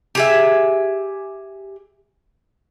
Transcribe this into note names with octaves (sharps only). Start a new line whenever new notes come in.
G4 G#4 E5